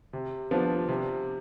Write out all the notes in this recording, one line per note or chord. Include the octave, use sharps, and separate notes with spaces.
C3
F3 B3 D4
C3